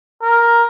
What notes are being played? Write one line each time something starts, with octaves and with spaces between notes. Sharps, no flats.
A#4